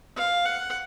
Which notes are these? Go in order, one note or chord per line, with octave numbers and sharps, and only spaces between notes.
F5
F#5